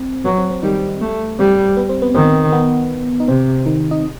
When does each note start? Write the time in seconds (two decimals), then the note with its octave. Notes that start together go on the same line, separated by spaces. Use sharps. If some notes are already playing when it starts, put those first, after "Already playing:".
Already playing: C4
0.25 F#3 B3
0.38 C4
0.50 C4
0.63 D#3 G3 D#4
1.01 A3
1.39 G3 C4
1.77 B3
1.89 C4
2.02 B3
2.14 D#3 C4
2.52 B3
3.20 D#4
3.28 C3 C4
3.66 D#3 D#4
3.91 D#4 D#5